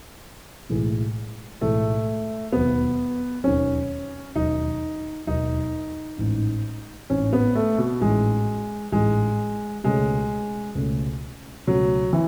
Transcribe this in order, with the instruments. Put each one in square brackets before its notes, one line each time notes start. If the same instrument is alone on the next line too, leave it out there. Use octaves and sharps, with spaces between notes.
[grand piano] B1 A2 E3 G#3
[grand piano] B1 A2 E3 G#3 [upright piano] A3
[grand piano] E1 D#2 D#3 F#3 [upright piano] B3
[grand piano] E1 D#2 D#3 F#3 [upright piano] C#4
[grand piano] E1 D#2 D#3 F#3 [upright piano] D#4
[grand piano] E1 D#2 D#3 F#3 [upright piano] D#4
[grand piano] A1 G#2 E3
[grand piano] A1 G#2 E3 [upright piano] C#4
[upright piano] B3
A3
B2
[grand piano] A1 G#2 E3 [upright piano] G#3
[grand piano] A1 G#2 E3 [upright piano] G#3
[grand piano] C#2 B2 A3 C#4 [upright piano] G#3
[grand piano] C#2 B2 A3 C#4
[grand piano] C#2 B2 A3 C#4 [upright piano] F#3
[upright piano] E3